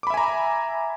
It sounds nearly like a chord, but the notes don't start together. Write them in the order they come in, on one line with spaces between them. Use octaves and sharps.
D6 B5 E5 G#5 A#5